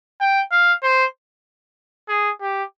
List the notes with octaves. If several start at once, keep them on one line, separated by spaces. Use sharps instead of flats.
G5
F5
C5
G#4
G4